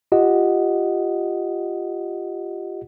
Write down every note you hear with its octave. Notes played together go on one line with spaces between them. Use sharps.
F4 G4 D#5 F#5